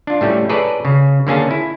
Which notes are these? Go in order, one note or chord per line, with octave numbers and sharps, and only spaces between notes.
D4 F4
A2 G3 A3 C#4
G#4 A4 B4 C#5 D5 A#5
C#3
D3 A#3 C#4 G#4 A5
E4